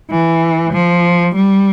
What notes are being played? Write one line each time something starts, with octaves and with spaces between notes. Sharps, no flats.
E3
F3
G3